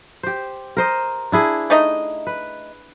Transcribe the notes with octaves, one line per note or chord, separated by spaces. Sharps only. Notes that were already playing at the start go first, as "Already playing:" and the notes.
G4 C5
A#4 C5 D#5
D4 E4 G#4
A3 D#4 D#5
B4